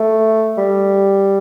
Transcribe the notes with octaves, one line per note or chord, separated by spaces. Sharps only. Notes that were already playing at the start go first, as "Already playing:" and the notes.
Already playing: A3
G3